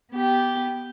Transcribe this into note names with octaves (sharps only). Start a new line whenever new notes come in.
B3 G4